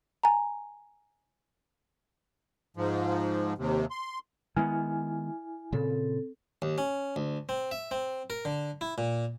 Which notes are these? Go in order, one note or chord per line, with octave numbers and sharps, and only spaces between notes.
G#5 A#5
G#2 F3
D#2 C3
C6
D#3 G#3 B3 E4 G#5 F6
A#2 C#3 C4 A4
D#2
C#4
D2
C4
E5
C4
A#4
D3
E4
A#2